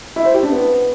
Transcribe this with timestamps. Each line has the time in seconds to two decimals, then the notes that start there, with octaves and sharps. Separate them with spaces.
0.16 E4
0.25 C5
0.34 G4
0.43 D4
0.52 B3